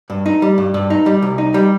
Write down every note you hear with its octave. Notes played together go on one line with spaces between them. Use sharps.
G2
D#4
G3
G2
G2
D#4
G3
C2
D#4
G3